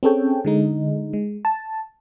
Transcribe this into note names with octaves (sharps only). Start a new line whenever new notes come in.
C4 C#4 G#4 A4 C#5 G5
D3 G#3 D#4
G#3
A5